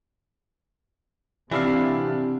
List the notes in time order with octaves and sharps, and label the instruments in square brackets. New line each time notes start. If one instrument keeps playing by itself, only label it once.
[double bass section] C3 [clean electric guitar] E3 E4 F5 [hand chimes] C4 G4 [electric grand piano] D4 D5